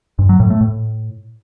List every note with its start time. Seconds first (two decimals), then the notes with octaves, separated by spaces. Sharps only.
0.19 G2
0.29 F#3
0.40 A2
0.50 A3
0.61 A2